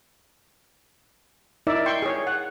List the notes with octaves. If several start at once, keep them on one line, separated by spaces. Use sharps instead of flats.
D#4 E4 A#4 D5 E5
G5 C6 C#6
G#4 C#5
F#5